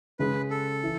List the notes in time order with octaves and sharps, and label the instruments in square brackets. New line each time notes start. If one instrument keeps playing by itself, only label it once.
[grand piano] C#3 G#3 C#4 G#4 [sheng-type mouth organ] B4
[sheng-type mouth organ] A4
[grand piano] E3